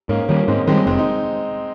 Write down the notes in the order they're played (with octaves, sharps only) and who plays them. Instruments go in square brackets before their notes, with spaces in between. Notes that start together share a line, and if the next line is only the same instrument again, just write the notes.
[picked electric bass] G#2 [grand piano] A#3 C#4
[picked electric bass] D#3 G3 [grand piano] A#3 C#4
[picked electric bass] G#2 [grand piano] G#3 C4
[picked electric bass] D#3 G3 [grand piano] G#3 C4
[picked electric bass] F1 [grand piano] G#3 C4
[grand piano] D#4